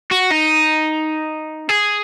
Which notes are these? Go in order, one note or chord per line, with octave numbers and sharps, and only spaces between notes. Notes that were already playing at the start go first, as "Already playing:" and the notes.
F#4
D#4
G#4